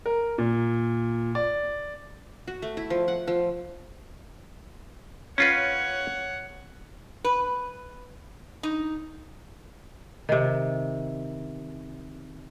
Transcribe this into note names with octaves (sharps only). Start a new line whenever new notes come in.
A#4
A#2
D5
F#4
A3
E4
F3
F#5
F3
C#4 F4 B4 C#5 F#5
B4
D#4
C3 D#3